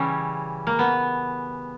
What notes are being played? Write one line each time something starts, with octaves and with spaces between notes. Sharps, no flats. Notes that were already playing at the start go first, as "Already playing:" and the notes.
Already playing: C#3 E3 G3 C#4
A#3
B3